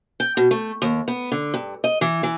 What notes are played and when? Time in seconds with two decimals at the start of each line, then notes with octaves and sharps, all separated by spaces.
0.20 G5
0.37 B2
0.51 A3
0.82 D#2
1.08 B3
1.32 D3
1.54 G2
1.84 D#5
2.01 E3
2.23 E3